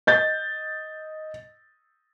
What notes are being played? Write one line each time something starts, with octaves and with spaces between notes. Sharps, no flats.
D#5 G6 A6